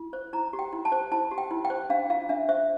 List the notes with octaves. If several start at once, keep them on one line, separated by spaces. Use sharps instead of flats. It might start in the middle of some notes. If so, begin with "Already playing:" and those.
Already playing: E4
C5
E4 A#5
G4
G5
E4
A5
C5
E4 A5
G4
G5
E4
G5
C5
D4 F5
F4 F5
D4 E5
C5 E5